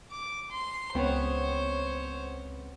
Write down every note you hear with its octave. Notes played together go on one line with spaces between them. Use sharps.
D6
C6
C#2 B3 C4 C5 C#5